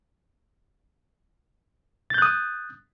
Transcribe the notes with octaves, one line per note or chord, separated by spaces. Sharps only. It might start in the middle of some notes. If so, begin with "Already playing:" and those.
D#6 F#6 G6 A6